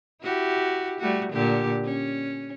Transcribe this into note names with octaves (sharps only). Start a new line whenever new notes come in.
E4 F#4 G4
G3 A3 F#4
A#2 D3 G4
C#4